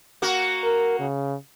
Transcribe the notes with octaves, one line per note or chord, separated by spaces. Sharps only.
A#3 F#4
A#4
C#3